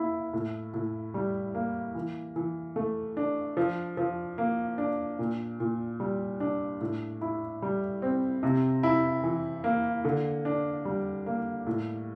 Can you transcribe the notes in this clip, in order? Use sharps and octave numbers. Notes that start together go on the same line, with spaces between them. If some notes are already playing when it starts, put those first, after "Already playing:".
Already playing: A#3 E4
A2
A2
G3
A#3
E3
E3
A3
D4
F3
F3
A#3
D4
A#2
A#2
G3
D4
A2
E4
G3
C4
C3
E4
E3
A#3
D3
D4
G3
A#3
A2